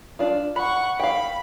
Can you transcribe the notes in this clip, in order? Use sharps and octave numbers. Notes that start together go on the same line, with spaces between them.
D4 F4
F#5 B5 C#6
F5 G5 B5